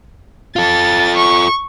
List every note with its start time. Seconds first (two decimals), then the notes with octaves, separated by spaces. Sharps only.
0.56 F4 A4 A6
1.17 C#6